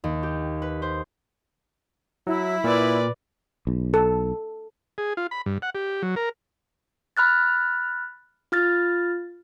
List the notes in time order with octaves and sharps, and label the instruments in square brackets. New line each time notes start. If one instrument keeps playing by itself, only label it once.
[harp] D#2
G4
B4
C5
[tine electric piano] F#3 [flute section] E4
[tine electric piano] A#2 [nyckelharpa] B4 D5
[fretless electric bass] B1
[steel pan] A4
[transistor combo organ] G#4
F4
B5
G2
F#5
G4
F#3
A#4
[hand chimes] B5 F6 F#6 A6
F4 F6 A6